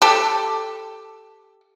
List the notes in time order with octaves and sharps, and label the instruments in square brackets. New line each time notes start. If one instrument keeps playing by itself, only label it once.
[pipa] G4 A4